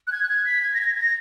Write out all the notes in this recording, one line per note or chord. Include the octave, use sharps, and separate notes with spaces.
F#6
G#6
F#6
G#6
B6
G#6
A#6
G#6
A#6
G#6
A#6